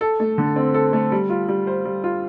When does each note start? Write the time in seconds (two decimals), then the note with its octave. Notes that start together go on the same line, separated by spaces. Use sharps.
0.01 A4
0.20 A3
0.38 D3
0.56 C4
0.74 A4
0.93 A3
1.12 G3
1.30 F4
1.48 G3
1.67 C5
1.85 G3
2.04 F4